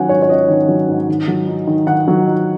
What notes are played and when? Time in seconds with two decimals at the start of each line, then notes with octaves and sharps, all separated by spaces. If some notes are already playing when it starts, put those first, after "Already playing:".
Already playing: D#3 F#3 C#4 F#5 G#5
0.09 G#2 C#5
0.22 C#5
0.29 C#4 D#5
0.48 D#3
0.68 F#3
0.88 G#2
1.08 D#3
1.28 F#3
1.47 D#4
1.67 D#3
1.87 D#3 F#5
2.08 F#3
2.27 D#4